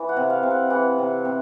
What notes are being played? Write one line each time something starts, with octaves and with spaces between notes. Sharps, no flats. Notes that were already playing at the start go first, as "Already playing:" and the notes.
Already playing: E3
F#5
C3
F5
C3
F#5
E3 F#5
C3
C3